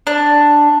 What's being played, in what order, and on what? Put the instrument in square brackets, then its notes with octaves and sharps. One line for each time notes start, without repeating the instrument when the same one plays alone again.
[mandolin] D4